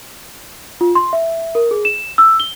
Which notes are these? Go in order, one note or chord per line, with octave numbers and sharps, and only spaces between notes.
F4
C6
E5
A#4
G#4
E7
E6
G7